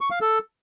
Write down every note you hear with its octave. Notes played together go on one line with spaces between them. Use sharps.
C#6
F5
A4